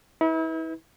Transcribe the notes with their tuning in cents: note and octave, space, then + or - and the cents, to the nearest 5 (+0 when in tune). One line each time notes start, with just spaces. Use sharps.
E4 -40 B4 +0